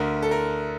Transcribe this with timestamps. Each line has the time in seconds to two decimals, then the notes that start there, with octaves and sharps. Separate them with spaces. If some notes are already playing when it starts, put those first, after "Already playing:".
Already playing: D2 D3 A#4
0.22 A4
0.31 A#4